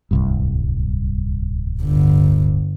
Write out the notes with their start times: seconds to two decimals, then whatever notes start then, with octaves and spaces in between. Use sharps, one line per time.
0.11 D1 C2 G2
1.82 G1 D3